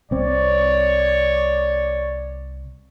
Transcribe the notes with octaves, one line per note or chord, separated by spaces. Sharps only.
C2 C4 C#5 D5